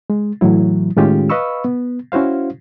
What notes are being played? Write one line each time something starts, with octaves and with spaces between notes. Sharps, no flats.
G#3
A2 E3 F#3 E4
A2 D#3 G#3 C#4 F4 G4
B4 D#5 F5 B5 C#6 E6
B3
C#4 E4 F#4 C5 F5